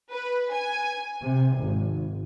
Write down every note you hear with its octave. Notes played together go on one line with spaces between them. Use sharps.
B4
G#5
C3
G#1